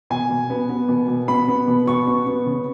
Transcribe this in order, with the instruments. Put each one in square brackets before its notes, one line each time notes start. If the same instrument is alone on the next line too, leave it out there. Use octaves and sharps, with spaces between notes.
[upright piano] B2 G#5
B2
B3
B3
B2
B2
B3 B5
B3
B2
B2 C#6
B3
B3
C#3